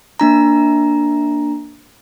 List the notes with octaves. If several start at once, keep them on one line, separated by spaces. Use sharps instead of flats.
A#3 D4 A#5